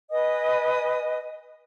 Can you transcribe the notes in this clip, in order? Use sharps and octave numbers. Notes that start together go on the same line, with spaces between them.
B4 D#5 G#5 D#6